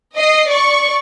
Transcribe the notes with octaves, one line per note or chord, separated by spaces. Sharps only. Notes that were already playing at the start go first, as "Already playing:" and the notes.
D#5 C7
D5 C#6